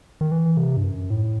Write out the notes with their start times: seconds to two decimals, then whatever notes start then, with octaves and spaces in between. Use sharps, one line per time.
0.21 D#3
0.31 E3
0.57 C3
0.77 G2
0.84 F#2
1.10 A2